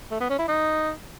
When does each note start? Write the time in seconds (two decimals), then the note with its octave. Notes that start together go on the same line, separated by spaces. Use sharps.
0.11 A3
0.20 B3
0.30 C#4
0.39 E4
0.48 D#4